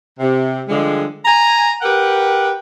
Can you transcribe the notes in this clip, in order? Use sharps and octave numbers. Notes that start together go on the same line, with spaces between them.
C3
D3 F3 G3 G#3
G#5 A#5
G4 A#4 B4 F#5 G5